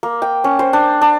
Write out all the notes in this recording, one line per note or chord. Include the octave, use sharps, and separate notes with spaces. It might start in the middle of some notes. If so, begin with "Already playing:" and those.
A#3
G5
C#4
C5
D4
D4